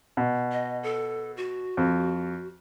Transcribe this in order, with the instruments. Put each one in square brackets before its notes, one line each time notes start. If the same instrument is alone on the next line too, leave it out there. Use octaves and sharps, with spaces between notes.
[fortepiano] B2
[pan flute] D#5
A4
F#4
[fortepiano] F2